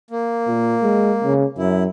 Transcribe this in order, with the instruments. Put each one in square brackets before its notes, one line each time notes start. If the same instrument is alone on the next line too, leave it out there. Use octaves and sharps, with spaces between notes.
[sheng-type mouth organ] A#3
[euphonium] A#2
G#3
C#3
[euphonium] F#2 [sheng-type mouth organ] E4